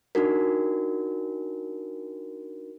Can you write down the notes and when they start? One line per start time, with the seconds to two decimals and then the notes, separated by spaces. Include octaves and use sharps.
0.15 D4 D#4 F#4 A#4